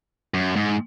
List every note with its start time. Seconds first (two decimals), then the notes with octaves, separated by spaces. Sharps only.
0.34 F#2
0.56 G#2